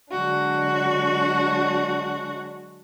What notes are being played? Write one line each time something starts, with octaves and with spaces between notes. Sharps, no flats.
D3 F#3 G#3 D4 F#4